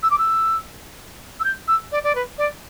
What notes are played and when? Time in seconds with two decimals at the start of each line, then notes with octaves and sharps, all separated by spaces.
0.03 E6
0.11 D6
0.18 E6
1.40 E6
1.44 G6
1.68 E6
1.92 D5
2.03 D5
2.15 B4
2.38 D5